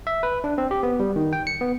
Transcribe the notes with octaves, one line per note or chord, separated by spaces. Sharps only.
E5
B4
D4
C4
G4
B3
G3
D#3
G5
C#7
B3